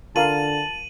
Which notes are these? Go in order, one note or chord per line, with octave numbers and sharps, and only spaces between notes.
D3 F4 A#4 F5 A5 D#7 F#7